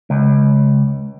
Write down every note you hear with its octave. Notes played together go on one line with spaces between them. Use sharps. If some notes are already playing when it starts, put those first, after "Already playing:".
C#2